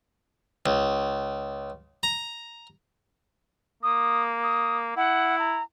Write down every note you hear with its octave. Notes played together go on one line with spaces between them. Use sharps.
C#2
A#5
A#3 D#6
D#6
E4 F#5
A#5